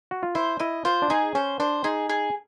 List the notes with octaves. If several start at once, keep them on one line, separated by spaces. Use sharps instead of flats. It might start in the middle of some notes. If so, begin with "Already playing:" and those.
F#4
F4
E4 C5
E4 D#5
F4 C5
D4
D#4 G#4
C#4 C5
D4 C5
D#4 G#4
G#4